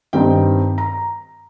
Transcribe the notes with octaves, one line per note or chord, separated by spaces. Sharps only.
G2 D#3 G3 C4 D#4 G5
A#5